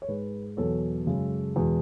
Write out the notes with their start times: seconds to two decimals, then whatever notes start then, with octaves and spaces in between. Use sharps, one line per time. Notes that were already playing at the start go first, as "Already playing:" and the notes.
0.02 C#5
0.08 G#2 G#3 B4
0.57 E2 B2 F#3 A4 C#5
1.06 F#2 C#3 G#3
1.56 E2 B2 G#3